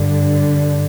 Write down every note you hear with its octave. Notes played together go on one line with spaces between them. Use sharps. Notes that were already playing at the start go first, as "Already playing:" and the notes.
Already playing: G2 D3